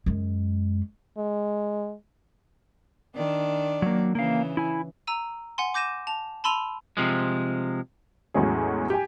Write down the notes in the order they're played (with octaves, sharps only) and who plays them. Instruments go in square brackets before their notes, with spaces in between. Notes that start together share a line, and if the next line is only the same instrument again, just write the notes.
[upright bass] F#2 G#3
[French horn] G#3
[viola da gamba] D#3 D4 D5
[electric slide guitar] F#3 A#3
[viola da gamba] C#3 E3 [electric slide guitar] A#3 F5
[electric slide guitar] E4 G#5
[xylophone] A#5 E6 D#7
F#5 G#5 C6
D6 G6 A#6 D#7 E7
A5 F7
A5 B5 C6 E6 D#7 F7
[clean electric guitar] C3 F3 G#3
[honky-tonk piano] E2 A2 F#3 G#3 C#4 G#4
G4 G#5